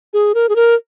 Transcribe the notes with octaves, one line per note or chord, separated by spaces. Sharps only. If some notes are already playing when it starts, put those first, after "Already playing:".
G#4
A#4
G#4
A#4